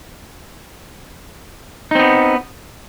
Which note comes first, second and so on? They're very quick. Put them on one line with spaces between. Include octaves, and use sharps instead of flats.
D#4 C4 B3